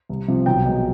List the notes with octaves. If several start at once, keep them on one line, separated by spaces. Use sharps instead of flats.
C2
C3 F3
B1 G5
B2 G#3